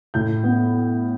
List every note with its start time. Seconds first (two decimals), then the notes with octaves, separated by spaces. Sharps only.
0.14 A2 G6
0.44 B3